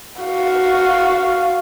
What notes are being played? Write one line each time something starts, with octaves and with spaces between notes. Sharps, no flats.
F#4 F5